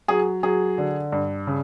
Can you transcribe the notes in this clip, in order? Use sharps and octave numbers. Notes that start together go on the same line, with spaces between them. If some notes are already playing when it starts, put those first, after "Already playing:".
F#3 G#4
F#3 G#4
D3
G2
C#3